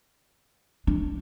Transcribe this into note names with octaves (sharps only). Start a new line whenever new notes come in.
D4